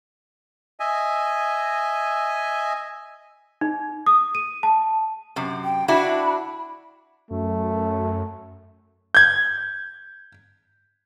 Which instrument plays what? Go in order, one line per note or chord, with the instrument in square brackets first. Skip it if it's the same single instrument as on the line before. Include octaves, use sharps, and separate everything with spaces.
[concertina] D#5 E5 G#5
[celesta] D#4
D#6
D#7
A5
[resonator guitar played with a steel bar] F#2 C3
[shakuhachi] G5
[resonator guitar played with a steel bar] D4 E4 F#4 [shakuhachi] B5
[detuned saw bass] F#2 [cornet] A3
[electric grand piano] G6 G#6